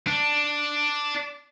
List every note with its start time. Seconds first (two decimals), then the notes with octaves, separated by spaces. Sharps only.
0.07 D4